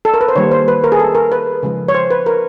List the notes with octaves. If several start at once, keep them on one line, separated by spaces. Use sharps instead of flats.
A4
A#4
B4
C5
D#3 G3 A#3 C#5
C5
B4
A#4
G#4
A4
A#4
B4
C#3 F3 G#3
C#5
C5
B4
A#4